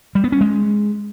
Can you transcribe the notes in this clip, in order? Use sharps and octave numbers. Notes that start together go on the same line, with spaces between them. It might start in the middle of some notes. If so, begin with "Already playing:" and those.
G3
B3
C#4
G#3